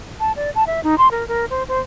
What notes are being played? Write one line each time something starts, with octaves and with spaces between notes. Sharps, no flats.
A5
D5
A5
E5
D#4
C6
A#4
A#4
C5
C5